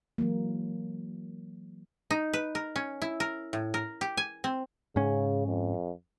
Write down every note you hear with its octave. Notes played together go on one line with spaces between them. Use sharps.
E3 F#3 G#3 A#3
D#4
B4
A#4
C#4
E4
A#4
A2
A#4
G4
G#5
C4
G#2 C#3 C#4
F2